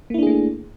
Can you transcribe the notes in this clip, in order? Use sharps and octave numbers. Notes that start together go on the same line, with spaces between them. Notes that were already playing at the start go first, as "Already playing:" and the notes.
A3 A#3 D4 E4 G#4